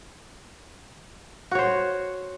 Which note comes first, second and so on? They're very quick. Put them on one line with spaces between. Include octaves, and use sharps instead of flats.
F#4 C#5 C5